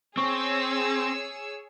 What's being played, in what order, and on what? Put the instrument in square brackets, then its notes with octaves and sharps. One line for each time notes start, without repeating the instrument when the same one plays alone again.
[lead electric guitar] C4 [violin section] G#4 C#5 E6 [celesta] C#6